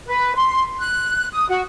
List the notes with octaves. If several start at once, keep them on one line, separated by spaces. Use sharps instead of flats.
B4
C6
F#6
D#6
F#4